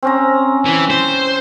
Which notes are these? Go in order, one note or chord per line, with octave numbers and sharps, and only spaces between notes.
C4 C#4 A#5
E3
C5